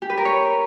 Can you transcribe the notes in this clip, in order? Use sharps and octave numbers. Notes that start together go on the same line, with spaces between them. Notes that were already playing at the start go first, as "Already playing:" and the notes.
G4
B4
A#4
C#5